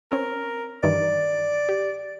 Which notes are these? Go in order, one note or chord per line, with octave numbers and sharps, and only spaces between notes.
C4 C#4 A#4
G2 D#3 E3 D5
G4